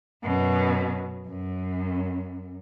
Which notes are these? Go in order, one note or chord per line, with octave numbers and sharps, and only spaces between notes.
F#2 B2
F#2